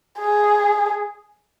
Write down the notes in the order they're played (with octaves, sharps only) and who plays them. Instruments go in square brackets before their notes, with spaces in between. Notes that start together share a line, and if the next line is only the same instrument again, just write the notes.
[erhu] G#4